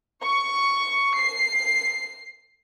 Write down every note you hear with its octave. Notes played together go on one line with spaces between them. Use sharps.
C#6
C7